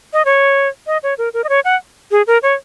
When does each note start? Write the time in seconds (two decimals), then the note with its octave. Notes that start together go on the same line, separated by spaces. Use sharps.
0.13 D#5
0.25 C#5
0.87 D#5
1.03 C#5
1.18 A#4
1.34 A#4
1.44 D#5
1.49 C#5
1.65 F#5
2.11 G#4
2.27 A#4
2.43 C#5